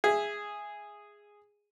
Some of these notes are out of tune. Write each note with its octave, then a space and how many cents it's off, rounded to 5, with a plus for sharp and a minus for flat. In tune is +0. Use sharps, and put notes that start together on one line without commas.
G#4 -5 E5 +10